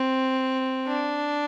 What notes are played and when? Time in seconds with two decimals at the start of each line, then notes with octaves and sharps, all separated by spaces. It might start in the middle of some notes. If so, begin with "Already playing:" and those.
Already playing: C4
0.87 D4